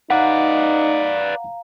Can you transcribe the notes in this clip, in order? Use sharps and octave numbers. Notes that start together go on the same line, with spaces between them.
D#4 B4 D5 F5 F#5 A#5